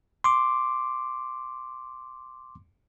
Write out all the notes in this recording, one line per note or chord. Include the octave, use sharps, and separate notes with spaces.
C6 D6